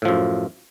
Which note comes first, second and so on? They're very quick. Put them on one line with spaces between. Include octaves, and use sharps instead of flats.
A2 F3 F#2